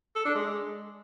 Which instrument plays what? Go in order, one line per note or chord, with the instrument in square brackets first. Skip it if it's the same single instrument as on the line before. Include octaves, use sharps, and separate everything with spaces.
[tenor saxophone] A4
D4
G#3